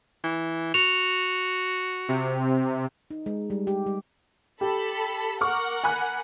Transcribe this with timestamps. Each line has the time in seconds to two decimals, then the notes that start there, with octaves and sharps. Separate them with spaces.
0.24 E3
0.74 F#4 F7
2.08 C3
3.10 D#4
3.26 G#3
3.50 G3
3.67 G4
3.86 G3
4.61 G4 A4 B5
5.41 A#4 F#5 C#6 D6 F6
5.84 G#5 B5 F#6